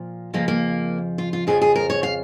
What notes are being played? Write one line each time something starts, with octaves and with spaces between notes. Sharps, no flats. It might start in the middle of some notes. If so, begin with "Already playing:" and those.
Already playing: A#2 F3
F2 C#3 F3 A#3
A#3
F4
F4
F2 C#3 F3 G#4
G#4
A#4
C#5
F5